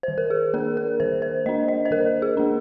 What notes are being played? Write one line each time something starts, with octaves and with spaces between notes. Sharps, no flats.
D#3 C5
A#4
G#4
A#3 D4 A#4
A#4
D#3 C5
C5
A#3 D4 D#5
D#5
C5
D#3 A#4
G#4
A#3 D4